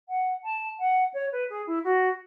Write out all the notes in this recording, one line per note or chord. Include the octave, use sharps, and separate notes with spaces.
F#5
A5
F#5
C#5
B4
G#4
E4
F#4